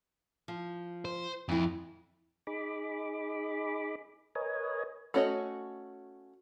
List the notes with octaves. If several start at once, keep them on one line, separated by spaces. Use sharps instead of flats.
F3
C5
F2 E3 E4
D#4 G#4 B5 D6
A#4 B4 C#5 D#5 G#5
A3 C#4 F#4 C#5 D#5